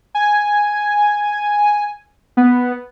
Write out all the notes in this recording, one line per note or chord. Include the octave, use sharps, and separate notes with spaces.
G#5
B3